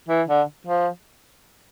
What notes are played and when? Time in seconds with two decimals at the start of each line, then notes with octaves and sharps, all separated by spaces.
0.09 E3
0.28 D3
0.67 F3